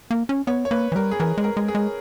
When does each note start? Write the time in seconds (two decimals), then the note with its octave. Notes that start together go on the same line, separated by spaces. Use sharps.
0.11 A#3
0.29 C#4
0.47 B3 C#5
0.65 C#5
0.71 A#3 B4
0.92 E3
0.95 G3 A#4
1.11 G#4
1.20 E3 A#4
1.38 G#3
1.44 A#4
1.57 G#3
1.68 G#4
1.75 G#3